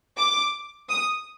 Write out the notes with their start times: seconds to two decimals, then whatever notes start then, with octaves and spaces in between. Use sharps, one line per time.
0.17 D6
0.89 D#6